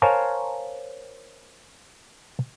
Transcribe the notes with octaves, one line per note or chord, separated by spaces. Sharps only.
A#4 C5 C#5 F5 G#5 A5